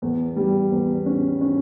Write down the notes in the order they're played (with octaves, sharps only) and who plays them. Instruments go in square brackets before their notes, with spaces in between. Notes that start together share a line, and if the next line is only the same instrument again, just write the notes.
[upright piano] E2
G3
E2
C#4
C#4